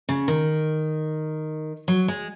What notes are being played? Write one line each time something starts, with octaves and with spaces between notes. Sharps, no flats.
C#3
D#3
F#3
G#3